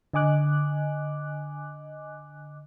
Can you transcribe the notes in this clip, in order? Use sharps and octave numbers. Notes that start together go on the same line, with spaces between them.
D3 D#5 G#5 D6 F#6